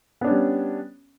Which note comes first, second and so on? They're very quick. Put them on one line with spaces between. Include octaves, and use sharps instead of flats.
B3 D4 C#4 G3